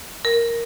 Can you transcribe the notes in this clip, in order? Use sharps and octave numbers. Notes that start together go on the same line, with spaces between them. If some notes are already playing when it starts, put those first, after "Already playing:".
A#4